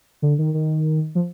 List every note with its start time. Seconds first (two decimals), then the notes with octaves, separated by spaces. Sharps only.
0.22 D3
0.39 D#3
0.54 D#3
1.15 F3